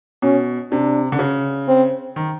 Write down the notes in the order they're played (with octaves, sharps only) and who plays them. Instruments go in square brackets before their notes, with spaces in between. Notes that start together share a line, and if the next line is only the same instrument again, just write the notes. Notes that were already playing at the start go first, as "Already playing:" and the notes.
[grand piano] B2 [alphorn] C#4
[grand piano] C3 [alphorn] D4
[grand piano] D3
C#3
[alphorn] C4
[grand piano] D#3